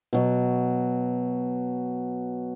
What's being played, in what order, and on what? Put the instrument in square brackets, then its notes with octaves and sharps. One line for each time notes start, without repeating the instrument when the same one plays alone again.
[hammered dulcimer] B2 F#3